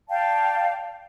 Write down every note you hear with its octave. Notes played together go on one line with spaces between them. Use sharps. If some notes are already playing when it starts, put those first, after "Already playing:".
D5 F5 G5 A5